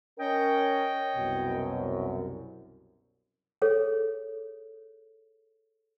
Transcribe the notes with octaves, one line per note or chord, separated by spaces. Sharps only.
C#4 A#4 C#5 D#5 G5
C2 F#2 B2
G#4 A4 C#5